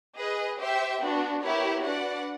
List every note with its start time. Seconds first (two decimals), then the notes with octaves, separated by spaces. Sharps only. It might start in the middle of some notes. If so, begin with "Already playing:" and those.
0.16 G#4 B4 D#5
0.59 G4 C5 E5 G5
1.01 B3 D4 F#4
1.43 B3 E4 G4 A#4 C#5
1.84 D4 F#4 B4 D5 F#5